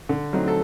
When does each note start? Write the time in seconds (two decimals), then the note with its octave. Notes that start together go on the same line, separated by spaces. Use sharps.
0.09 D3
0.33 F#3 A3 C4 D#4
0.48 A4